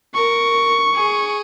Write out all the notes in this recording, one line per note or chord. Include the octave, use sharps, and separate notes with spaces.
A#4 C#6
G#4